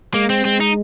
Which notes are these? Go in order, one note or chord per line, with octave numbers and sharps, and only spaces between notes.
G#3 A#3
C4
G#3 C4
D#4